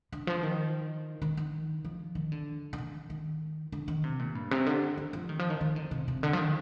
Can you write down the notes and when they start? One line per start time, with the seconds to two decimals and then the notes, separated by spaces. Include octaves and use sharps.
0.12 D3
0.27 F3
0.43 D#3
1.22 D#3
1.37 D#3
1.85 F3
2.15 D#3
2.32 D3
2.73 D3
2.78 D#3
3.10 D#3
3.72 D3
3.88 D#3
4.04 C3
4.19 A#2
4.35 G2
4.51 C3
4.66 D3
4.98 D#3
5.13 F3
5.29 D#3
5.39 F3
5.50 D#3
5.61 D#3
5.76 D3
5.91 C3
6.08 C3
6.23 D3
6.33 F3
6.39 D#3